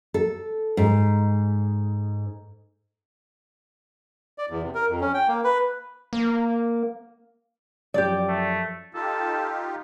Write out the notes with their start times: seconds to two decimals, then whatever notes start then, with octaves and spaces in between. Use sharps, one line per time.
0.14 A4
0.77 G#2
4.38 D5
4.50 E2
4.62 C3
4.75 A#4
4.89 F2
5.01 C#4
5.14 G5
5.28 A#3
5.44 B4
6.13 A#3
7.94 F#2 F3 G4 D5
8.28 A3
8.94 D#4 F4 G4 A4